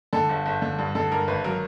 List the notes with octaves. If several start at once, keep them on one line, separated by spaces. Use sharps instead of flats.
D3 A4
G1
G1
D3
G2
D3 A4
G2 A#4
G#1 B4
F#3 A#4